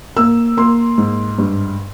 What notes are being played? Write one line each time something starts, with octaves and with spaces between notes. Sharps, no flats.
A#3 E6
A#3 C6
G#2
G2